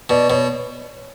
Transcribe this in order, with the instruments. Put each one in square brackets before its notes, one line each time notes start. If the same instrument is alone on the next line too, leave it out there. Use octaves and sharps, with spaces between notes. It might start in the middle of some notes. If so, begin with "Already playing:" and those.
[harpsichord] B2 [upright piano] D5
[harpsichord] B2 [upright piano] C#5